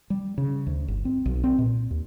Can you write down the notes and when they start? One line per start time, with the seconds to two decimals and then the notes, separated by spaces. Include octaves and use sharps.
0.10 G3
0.38 C#3
0.67 D2
0.88 G1
1.05 C4
1.26 B1
1.44 C4
1.58 A#2
1.91 D#2